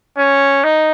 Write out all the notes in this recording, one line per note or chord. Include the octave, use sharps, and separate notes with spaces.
C#4
D#4